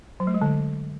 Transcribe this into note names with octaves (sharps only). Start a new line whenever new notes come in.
F#3
A3
G#3
D3